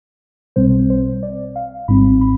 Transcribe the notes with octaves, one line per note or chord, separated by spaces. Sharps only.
B1 B2 G3 C4 C5
C5
D5
F5
G#1 G#2 G3 C4 B5
B5